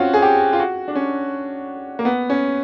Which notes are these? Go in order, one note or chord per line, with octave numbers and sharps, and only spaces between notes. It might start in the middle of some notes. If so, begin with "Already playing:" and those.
Already playing: C4 C#4 F4 F#4
G#4
G4
F4
F#4
D4
C#4
A#3
B3
C#4